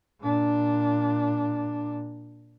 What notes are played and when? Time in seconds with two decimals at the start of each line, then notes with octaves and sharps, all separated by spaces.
0.20 A#2 D4